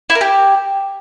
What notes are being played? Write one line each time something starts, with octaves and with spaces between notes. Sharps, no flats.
E4
A#4
G4